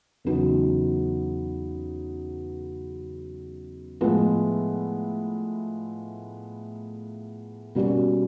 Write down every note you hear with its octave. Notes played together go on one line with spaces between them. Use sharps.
E2 C#3 F#3 B3 D#4
A2 F3 G#3 B3
B2 G3 A#3 C#4 F#4